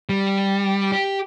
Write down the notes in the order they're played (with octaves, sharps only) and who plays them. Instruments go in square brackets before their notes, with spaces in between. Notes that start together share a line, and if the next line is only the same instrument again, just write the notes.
[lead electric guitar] G3
G4